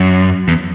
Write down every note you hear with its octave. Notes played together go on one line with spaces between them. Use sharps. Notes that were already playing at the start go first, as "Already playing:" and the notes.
Already playing: F#2
E2